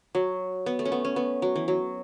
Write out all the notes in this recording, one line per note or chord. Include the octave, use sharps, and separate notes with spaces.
F#3
B3
A3
C#4
B3
C#4
B3
F#3
E3
F#3